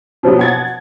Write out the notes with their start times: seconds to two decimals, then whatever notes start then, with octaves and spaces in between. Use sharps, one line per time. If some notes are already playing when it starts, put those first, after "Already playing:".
0.23 B2 F3 F#3 B3
0.39 F#5 G#6 A6